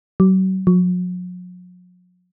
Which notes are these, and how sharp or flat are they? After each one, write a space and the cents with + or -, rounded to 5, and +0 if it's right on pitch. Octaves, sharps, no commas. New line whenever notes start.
F#3 +35
F#3 -45